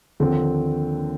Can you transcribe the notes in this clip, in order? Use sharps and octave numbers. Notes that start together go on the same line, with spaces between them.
D#2 D3 F3 C4